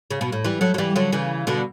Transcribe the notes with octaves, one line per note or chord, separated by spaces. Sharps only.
C#3
B2
A2
E3 G3
F#3 A3
F#3
E3 G3
D3 F#3
C#3 E3
B2 D3